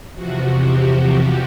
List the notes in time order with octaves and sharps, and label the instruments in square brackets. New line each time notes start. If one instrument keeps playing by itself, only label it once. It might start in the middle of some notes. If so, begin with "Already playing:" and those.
[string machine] E2 C3 F3 F#4
G4
F#4